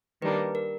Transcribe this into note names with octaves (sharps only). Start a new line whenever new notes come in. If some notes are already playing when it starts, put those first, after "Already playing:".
D#3 G3 A#3 D4 B4
A#4